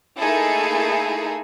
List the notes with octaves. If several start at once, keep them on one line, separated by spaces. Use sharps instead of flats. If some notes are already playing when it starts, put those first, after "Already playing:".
A3 A#3 D#4 E4 G#4 A4